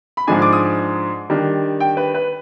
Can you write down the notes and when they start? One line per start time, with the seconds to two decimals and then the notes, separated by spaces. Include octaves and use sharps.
0.17 B5
0.27 G#2 F3 G#3 D4 G#5
0.42 D6
0.53 D#6
1.30 D#3 G3 D4
1.80 G5
1.97 B4
2.14 B4